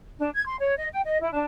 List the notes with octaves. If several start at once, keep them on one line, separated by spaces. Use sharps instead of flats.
D4
G#6
C6
C#5
D#5
G5
D#5
E4
D4